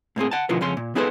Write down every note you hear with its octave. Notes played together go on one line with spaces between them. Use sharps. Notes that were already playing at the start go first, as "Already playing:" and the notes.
A2 A#3 C4 G#4
F#5 A5
B2 D3 E3 F3 A#3 B3
F2 C#3 C#4 C6
A#2
B3 D#4 G#4 A4 B4 C5